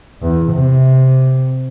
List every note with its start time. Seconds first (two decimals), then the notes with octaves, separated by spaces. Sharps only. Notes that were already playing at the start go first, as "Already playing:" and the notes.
0.22 E2
0.52 C3